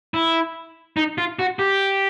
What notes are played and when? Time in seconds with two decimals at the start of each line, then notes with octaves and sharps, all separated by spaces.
0.14 E4
0.97 D#4
1.18 F4
1.39 F#4
1.59 G4